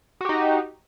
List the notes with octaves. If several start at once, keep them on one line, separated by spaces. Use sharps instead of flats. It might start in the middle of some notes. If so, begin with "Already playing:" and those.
D#4 F#4 G4